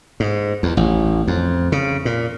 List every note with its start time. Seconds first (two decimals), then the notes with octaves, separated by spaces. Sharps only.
0.20 G#2
0.63 E2
0.77 A1
1.27 F2
1.72 C#3
2.05 A#2